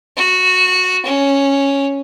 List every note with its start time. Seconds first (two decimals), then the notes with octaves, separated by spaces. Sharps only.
0.17 F#4
1.05 C#4